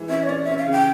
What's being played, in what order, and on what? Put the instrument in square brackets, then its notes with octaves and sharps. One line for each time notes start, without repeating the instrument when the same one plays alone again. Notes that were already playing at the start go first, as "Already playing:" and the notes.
Already playing: [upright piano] E3 G#3
[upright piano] C#4 [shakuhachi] E5
[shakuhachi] C#5
[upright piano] C#4 [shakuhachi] D5
[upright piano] C#4 [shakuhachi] E5
[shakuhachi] F5
[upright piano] C#3
[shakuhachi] G5